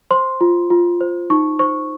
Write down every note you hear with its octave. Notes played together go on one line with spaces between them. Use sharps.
C5 C6
F4
F4
C5
D#4 C#6
C5 C#6